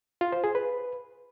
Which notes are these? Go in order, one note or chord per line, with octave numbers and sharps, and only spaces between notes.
F4
C5
G#4
B4